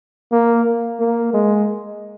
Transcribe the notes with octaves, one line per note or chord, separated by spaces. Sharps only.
A#3
A#3
G#3